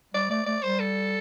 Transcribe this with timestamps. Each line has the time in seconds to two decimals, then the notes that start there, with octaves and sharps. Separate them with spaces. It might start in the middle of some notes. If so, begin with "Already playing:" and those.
0.14 G3 D5
0.30 A3 D5
0.47 A3 D5
0.63 G3 C5
0.80 A4